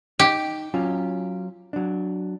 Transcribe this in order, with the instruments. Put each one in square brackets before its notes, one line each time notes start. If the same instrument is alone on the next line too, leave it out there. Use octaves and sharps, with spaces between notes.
[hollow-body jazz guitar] D#4 [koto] G4
[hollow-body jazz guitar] F#3 C#4 F4
F#3 D4